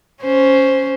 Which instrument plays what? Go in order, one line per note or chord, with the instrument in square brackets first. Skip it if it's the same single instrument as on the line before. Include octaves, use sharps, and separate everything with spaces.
[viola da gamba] C#4 C5